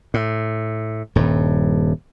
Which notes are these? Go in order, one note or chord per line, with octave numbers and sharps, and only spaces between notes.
A2
D#1 G2